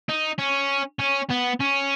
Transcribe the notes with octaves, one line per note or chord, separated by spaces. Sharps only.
D#4
C#4
C#4
B3
C#4